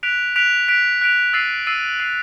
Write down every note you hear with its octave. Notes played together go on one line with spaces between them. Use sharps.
F#6 B6 D7 F7
F#6 B6 D7 F7
F#6 B6 D7 F7
F#6 B6 D7 F7
E6 A6 C7 D#7
E6 A6 C7 D#7
E6 A6 C7 D#7